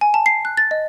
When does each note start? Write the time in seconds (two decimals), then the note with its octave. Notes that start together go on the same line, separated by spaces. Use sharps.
0.01 G#5
0.14 A5
0.26 C7
0.45 F#6
0.57 A6
0.71 D#5